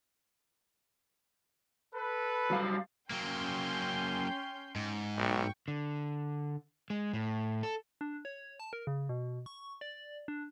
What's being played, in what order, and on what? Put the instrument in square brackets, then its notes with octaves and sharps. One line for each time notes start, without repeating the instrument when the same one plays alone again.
[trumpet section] A4 B4
[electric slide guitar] F#3 G3 F5
[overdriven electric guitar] F#3 A#3 [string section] C#4 G5 C6
[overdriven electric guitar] G#2
[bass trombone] B1 [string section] G5 C#6
[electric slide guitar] D3
G#3
A2
A4
[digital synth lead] D4
C#5
A5
A#4
C#3
B2
C#6
D5
D4